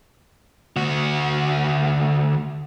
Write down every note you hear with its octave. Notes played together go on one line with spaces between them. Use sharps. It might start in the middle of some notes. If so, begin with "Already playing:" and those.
D2 F#4